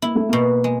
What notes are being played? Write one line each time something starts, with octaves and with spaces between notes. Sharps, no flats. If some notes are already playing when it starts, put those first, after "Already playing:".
A#3 E4
A3
B2 A#3
G#3